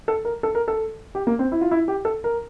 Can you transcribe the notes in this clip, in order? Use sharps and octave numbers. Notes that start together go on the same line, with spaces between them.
A4
A#4
A4
A#4
A4
G4
A#3
C4
E4
F4
E4
G4
A4
A#4